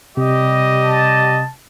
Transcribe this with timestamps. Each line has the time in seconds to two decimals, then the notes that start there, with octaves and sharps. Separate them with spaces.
0.17 C3 G3 G4 D#5
0.83 A5